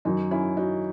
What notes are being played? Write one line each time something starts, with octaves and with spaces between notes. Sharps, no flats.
F#2 D#3 F#3 D#4
C#4 E4
D#4 F#4